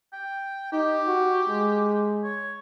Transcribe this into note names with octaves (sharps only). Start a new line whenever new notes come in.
G5
D#4 G4
F#4
G#3
C#5